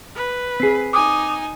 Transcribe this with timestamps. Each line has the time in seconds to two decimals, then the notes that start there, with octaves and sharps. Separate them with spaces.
0.15 B4
0.60 C4 G#4 B6 C7
0.93 D#4 G#5 D6 D#6